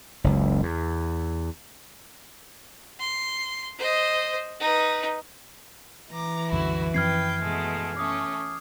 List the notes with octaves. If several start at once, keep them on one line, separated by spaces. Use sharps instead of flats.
F#1 C#2
E2
C6
C5 D#5
D#4 B4
E3 A#5 D6
C2 F#2 D3 E4 F#4
F#2 F3 C4 B4 G5 F6 G#6 C7
B2 G#3 A3
A3 C#4 D6 D#6